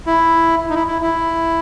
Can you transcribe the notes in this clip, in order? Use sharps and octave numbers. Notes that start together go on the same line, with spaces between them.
E4
D#4
E4
E4
E4